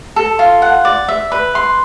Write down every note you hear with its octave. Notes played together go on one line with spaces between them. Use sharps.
A4
F4
F#5
D5
E5
B4
C6